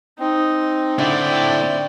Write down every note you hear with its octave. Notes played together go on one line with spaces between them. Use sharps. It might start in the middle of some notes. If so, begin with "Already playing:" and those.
C4 D#4
D3 A3 E4 D5 G5